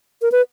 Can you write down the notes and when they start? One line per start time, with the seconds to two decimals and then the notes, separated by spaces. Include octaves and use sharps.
0.22 A#4
0.32 B4